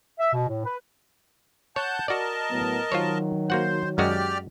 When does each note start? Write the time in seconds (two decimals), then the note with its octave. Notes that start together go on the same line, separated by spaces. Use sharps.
0.19 E5
0.34 B2
0.48 A2
0.65 B4
1.76 C#5 F#5 A5 G6
2.08 F#4 A#4 D5 D#5 A5
2.51 A2 F#3 B3
2.92 D#3 F#3 F4 C5 C#5
3.50 A#3 F#4 C5 F#5
3.98 F#2 G#3 F#4 G4 D5 F6